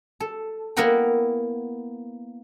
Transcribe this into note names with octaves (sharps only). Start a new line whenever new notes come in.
A4
A#3 B3 E4 A#4 F#5 G5